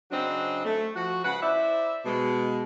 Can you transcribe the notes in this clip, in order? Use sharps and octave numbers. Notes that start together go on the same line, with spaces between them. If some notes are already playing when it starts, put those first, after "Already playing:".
C#3 F#3 C4 D4 D#5
A3
F3 F#4
C#3 G#3 B4 F#5
E4 C5 D5 E5
B2 G#3